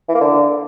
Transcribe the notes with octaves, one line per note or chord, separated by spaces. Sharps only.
E3
A#3
D3